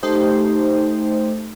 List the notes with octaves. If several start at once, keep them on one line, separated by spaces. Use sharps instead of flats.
A3 D#4 G4 C5